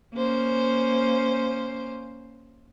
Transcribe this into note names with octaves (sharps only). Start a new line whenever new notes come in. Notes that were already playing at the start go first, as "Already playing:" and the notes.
A#3 C#4 C5